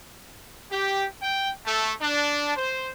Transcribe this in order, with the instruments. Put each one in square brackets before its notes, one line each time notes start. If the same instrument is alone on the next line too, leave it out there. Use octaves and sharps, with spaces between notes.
[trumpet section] G4
G5
A3
D4
C5